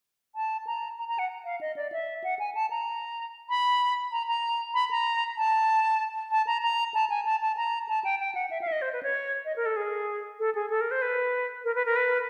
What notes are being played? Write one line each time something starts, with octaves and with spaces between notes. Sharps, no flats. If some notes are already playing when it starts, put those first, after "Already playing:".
A5
A#5
A#5
A#5
F#5
F5
D#5
D5
E5
F#5
G#5
A5
A#5
B5
A#5
A#5
B5
A#5
A5
A5
A#5
A#5
A5
G#5
A5
A5
A#5
A5
G5
G5
F#5
E5
F5
E5
D#5
C5
B4
C#5
D#5
A#4
A4
G#4
A4
G#4
A4
A#4
C5
B4
A#4
B4
A#4
B4